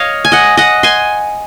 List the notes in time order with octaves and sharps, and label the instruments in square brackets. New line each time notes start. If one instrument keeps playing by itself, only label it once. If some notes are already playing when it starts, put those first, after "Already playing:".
Already playing: [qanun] C#5 D#5 F5
G#5
D#5 F#5
D#5 F#5
G#5 C6